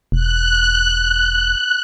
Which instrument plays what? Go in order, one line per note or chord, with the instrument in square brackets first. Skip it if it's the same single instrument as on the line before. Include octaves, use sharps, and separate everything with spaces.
[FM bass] E1 [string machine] F#6